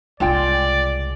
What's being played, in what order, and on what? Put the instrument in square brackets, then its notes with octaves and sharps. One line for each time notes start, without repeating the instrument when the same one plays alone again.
[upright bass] C2 C#3 [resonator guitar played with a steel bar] G#3 F4 G5 [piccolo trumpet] D5